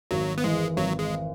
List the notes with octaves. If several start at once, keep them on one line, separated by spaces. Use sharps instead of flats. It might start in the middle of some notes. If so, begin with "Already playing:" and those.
G#1 F#3
B3
E3 G#3
G#1 F#3
G#3